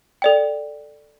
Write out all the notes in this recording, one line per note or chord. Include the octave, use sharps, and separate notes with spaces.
A4 D5 G5